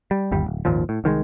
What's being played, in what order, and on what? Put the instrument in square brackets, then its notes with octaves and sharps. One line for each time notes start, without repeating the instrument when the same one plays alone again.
[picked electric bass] G3
G1 D#2 G3
D1
G#1 D#2 A#2 F3
A2
C2 D#3 F3 G#3